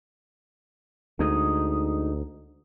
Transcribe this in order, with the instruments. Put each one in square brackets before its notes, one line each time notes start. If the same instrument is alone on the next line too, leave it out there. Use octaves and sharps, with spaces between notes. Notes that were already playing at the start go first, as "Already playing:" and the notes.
[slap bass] D2 [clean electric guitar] G#3 D#4 D#5